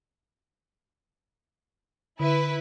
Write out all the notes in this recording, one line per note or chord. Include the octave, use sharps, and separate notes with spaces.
D3 E4 B4